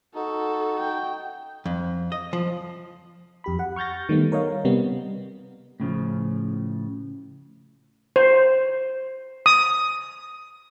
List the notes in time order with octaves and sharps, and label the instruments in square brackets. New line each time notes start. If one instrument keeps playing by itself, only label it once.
[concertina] D#4 [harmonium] F#4 [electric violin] A4
[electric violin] G5
[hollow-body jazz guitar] F2
D#5
F3
[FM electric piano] F2 G4 B5
G4 F#5
C#6 F6 G6 A6 A#6
D#3 G3 A3 B3
A#4 C#5 D#5 F5
C3 G3 B3
[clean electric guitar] A2 C#3 F3
[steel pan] C5
D#6